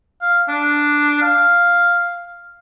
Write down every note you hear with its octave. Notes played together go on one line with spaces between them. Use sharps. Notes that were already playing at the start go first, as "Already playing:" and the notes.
F5
D4
F5